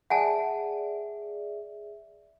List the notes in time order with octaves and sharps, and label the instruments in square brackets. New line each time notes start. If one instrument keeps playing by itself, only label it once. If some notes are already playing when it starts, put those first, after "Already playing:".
[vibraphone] G#4 D5 E5 [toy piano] F#5 G#5 A5